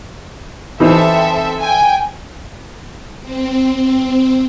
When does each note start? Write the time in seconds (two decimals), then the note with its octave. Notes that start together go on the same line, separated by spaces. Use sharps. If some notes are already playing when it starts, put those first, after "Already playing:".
0.80 E3 C4 D#4 A4 C5 E5
1.60 G5 G#5
3.22 C4